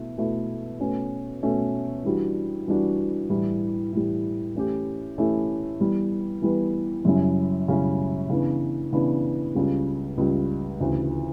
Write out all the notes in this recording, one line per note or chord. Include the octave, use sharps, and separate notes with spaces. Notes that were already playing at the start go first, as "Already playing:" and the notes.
Already playing: B2 A3 E4
B2 A3 E4 A4
B2 A3 C#4
B2 A3 C#4
E3 G3 D4 F#4
E3 G3 D4 F#4
A2 E3 G3
A2 E3 G3
E3 A3 C#4 E4 G4
E3 A3 C#4 E4 G4
E3 G3 B3
E3 G3 B3
F#2 C#3 G3 C#4 E4
F#2 C#3 G3 C#4 E4
C#3 E3 B3 D4
C#3 E3 B3 D4
C#2 C#3 G3
C#2 C#3 G3
D2 C#3 E3